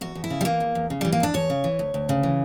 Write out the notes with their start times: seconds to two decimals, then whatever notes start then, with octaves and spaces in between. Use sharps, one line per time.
0.01 E2 F#4
0.15 E2
0.24 E4
0.30 C#3
0.41 G3
0.45 E3 A#3
0.60 E2
0.75 E2
0.90 C#3
1.01 E3 G3
1.13 A#3
1.20 E2 D4
1.34 E2 C#5
1.50 C#3
1.64 E3
1.79 D2
1.94 D2
2.09 C#3
2.23 E3